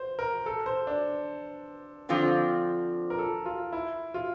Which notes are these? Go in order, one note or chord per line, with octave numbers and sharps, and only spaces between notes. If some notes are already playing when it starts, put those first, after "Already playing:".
Already playing: C5
A#4
A4
C5
D4
D3 F3 C4 F4
A#4
A4
F4
E4
F4